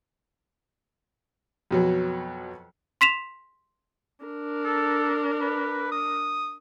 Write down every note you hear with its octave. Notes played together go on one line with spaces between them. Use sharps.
F2 B2 F#3
C6 B6 E7 F7
D4 A#4
A4
B4
D#6